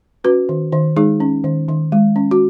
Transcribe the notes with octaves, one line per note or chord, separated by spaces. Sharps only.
C#4 F#4 B4
D#3
D#3
G#3 D#4 G#4
C#4
D#3
D#3
G#3
C#4
F#4